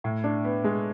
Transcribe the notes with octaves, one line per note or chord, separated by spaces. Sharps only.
A2
D4
B3
G#3